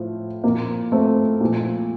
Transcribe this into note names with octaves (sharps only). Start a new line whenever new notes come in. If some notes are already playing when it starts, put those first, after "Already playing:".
Already playing: A2 F3
A#2 F3 A#3
A3 C4
A#2 F3